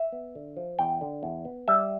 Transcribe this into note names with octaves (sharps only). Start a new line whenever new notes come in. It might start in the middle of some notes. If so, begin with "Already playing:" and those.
Already playing: E5
B3
D3
F3
E2 G5
D3
E2
B3
G3 E5